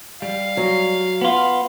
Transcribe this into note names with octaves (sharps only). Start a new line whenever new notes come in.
G3 F5
F#3
B3 F4